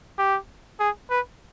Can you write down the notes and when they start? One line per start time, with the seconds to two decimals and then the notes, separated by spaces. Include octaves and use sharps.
0.19 G4
0.80 G#4
1.11 B4